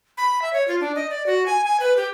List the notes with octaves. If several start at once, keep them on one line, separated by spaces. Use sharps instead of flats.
B5
E5
C#5
F4
D4
D#5
D5
F#4
G#5
G#5
B4
G4